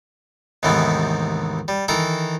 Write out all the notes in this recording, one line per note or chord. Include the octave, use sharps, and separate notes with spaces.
D#2 G#2 C3 E3 A3 B3
G3
D#3 E3 A4 A#5